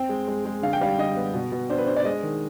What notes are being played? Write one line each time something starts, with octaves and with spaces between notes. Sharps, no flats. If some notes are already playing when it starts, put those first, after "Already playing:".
Already playing: C4 G5
G#3
G#3
G#3
D3 F5
G5
G3 F5
D3 D#5
B3
B2
B2
D4 C5
B4
D4 C5
D5
G#3 D#5
D#3